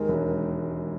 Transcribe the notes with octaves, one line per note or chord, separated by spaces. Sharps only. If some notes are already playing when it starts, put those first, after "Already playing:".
Already playing: D#2 D#3 G#3 A#4
E1